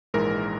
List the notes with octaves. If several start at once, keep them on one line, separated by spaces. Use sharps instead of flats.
A#1 G#2 E3 G#3 A#4